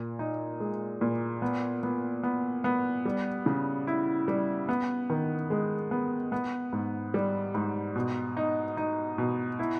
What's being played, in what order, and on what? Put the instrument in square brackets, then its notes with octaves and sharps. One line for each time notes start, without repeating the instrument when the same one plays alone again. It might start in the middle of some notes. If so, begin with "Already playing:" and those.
Already playing: [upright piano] A#2
D#4
G#3
A#2
B3
B3
B3
B3
G3
C#3
E4
G3
B3
D#3
G#3
B3
B3
G#2
G3
G#2
B2
D#4
D#4
B2
E4